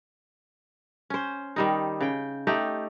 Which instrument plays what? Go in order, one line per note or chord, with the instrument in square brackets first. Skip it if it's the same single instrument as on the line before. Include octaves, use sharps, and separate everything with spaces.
[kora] C#4 C5
D#3 G3 D#4
C#3 G5
A3 D#4 G4